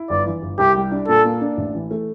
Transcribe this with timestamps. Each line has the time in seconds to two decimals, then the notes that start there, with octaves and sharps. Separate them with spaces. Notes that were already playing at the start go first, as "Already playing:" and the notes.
Already playing: E4
0.10 G1 D5
0.26 E3
0.42 G1
0.58 C2 G4
0.76 G3
0.92 D4
1.08 A#2 A4
1.25 A#3
1.41 D4
1.57 A1
1.75 E3
1.91 A3